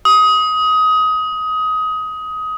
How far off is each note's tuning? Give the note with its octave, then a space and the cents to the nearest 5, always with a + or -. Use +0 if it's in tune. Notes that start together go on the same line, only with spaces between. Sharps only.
D#6 +20